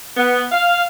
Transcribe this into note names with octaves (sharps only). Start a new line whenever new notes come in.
B3
F5